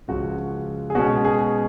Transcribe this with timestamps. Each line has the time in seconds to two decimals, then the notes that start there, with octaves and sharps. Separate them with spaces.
0.08 C#2 C#3 F3 F#4
0.90 G#4
0.95 B2 G#3 C#4 F#4
1.24 G#4